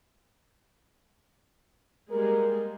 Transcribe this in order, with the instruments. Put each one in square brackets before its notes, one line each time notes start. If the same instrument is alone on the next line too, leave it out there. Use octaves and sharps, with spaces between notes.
[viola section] G3 G#3 A#3 [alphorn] A#4